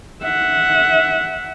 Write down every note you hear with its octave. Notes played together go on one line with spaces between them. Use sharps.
E5 F#5